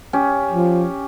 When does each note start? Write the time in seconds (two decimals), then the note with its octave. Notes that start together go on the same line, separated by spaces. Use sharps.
0.13 C#4 G4
0.51 F3